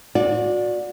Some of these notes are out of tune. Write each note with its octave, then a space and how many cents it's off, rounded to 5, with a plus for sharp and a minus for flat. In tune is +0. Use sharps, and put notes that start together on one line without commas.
F#4 -35 D5 +0